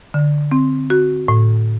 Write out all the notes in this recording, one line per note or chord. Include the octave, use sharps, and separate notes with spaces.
D3
C4
F#4
A2